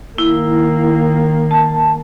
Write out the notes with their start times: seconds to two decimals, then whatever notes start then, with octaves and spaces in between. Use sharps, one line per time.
0.18 D#3 A#3 E4
1.51 A5